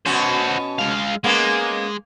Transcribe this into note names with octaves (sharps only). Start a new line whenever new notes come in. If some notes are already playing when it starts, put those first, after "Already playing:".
B2 C#4 F#4 C5
G#3 F5
G#3 A#3 B3 C#4